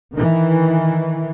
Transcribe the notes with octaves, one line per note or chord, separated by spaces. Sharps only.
D#3 E3